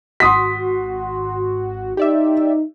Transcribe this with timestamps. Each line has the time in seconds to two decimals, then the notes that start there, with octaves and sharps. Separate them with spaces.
0.20 G#1 F#4 C6 D#6 B6
1.97 D#4 G4 D5 E5